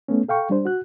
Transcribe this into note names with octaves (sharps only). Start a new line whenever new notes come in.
A3 B3 C#4
A4 F5 G5 C#6
G3 D4 C5
F#4 F#6